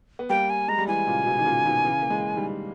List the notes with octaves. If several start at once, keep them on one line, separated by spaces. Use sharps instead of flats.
B3
G3 A#3 G5
G#5
G#3 A#5
G3
E3 G#3 G#5
A#2 C#3
B2
D#3
A#2 C#3
B2 D#3
C#3 E3
A#3
E3 G#3
D#3 G3